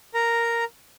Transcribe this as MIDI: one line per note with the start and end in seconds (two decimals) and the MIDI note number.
0.14 0.64 70
0.14 0.64 82